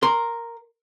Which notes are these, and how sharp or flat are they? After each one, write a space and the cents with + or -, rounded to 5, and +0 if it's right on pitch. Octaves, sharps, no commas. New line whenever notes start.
A#4 +0 C6 +5